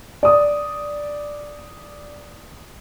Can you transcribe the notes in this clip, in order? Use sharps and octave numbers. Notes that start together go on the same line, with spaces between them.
D5 D#6